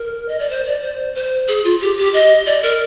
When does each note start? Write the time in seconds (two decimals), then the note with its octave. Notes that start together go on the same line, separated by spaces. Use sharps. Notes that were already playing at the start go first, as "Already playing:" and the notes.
Already playing: A#4
0.28 D#5
0.39 D5
0.50 C5
0.66 D5
0.82 C5
1.15 C5
1.48 G#4
1.64 F4
1.81 G4
1.97 G4
2.14 D#5
2.46 D5
2.63 A#4